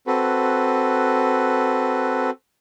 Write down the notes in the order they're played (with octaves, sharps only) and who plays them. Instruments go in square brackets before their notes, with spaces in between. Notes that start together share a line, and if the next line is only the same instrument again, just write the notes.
[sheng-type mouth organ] C4 F#4 A4 B4